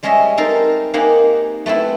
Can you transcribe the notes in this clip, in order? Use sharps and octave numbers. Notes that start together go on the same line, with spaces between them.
G3 G#3 C#4 G#4 D#5 E5
C4 D#4 A4 A#4 C5
A#3 C4 D#4 G4 G#4 F#5
A3 B3 C4 E4